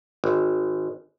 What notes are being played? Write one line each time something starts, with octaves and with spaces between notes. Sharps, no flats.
G#1